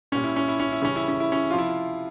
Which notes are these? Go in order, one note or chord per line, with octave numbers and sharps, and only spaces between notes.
A#2 G3 C#4
E4
C#4
E4
C#4
E4
C#3 E3 G3 C#4
E4
C#4
E4
C#4
C3 F3 F4
E4